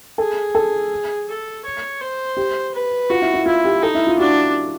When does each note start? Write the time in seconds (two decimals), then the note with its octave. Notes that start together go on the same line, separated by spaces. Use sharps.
0.18 G#4 A4
0.55 A4
1.28 A4
1.65 C#5
2.01 C5
2.37 G4
2.74 B4
3.10 F4 F#4
3.22 E4
3.34 E4
3.46 E4 F4
3.65 G4
3.83 D#4 A4
3.95 E4
4.07 F4
4.19 D4 F#4